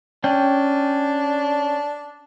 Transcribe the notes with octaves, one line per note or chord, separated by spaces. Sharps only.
C#4 D4 G5